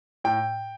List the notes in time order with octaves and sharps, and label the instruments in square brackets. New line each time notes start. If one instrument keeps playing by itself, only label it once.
[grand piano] A2 G5